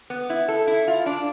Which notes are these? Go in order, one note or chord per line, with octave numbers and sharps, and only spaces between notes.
B3
E4
A4
E4
F4
D4